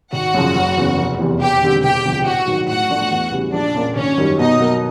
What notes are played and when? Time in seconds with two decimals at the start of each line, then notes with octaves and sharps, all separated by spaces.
0.13 G#1 F#4 F#5
0.34 F#2 C#3 F3
0.55 F#1
0.77 E2 C#3
0.98 F1
1.19 E2 C3 E3
1.40 E1 G4 G5
1.62 D#2 D3 G3 C4
1.83 E1 G4 G5
2.05 D2 C3 F3
2.26 A1 F#4 F#5
2.47 G#2 D#3 F#3
2.68 A2 F#4 F#5
2.90 F3 A3 D4
3.11 E2
3.32 C#3 E3 G3
3.53 A#1 D4 D5
3.75 A#2 F3 A#3 C#4
3.96 G#1 C#4 C#5
4.17 F#2 D#3 G3
4.39 B2 D#4 D#5
4.60 F#3 A#3